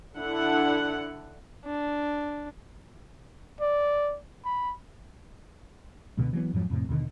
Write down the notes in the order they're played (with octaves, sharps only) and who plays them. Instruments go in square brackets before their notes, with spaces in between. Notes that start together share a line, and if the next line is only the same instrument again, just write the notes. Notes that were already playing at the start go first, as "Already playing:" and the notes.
[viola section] D3 D4 E4 F#5
[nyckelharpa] D4
[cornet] D5
B5
[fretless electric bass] C#2 B2 D3 B3
E3 F#3 G3 B3
F2 G#2 F3 F#3
F2 A2 C3
D#2 B2 D3 D#3